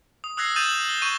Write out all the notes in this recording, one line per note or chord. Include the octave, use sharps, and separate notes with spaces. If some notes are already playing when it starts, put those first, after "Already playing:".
D#6
D#6 E6 F#6 G#6 A#6 C7
D#6 G6 A6 D#7 E7 F#7
F#7
G7
C#6 G6 D#7